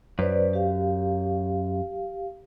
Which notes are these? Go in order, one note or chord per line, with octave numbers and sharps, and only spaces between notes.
F#2 B4 C5 D5
G4 F5